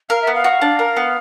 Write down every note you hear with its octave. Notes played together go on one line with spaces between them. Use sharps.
A#4 F5
E5
B3
F5
F#4
D4
A#4
B3